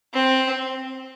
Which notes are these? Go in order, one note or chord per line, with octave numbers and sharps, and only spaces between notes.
C4